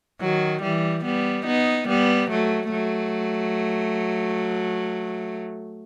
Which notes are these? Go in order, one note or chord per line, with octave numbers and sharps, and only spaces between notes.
D#3 F#3
E3 G3
G3 B3
B3 D#4
G3 B3
F#3 A3
F#3 A3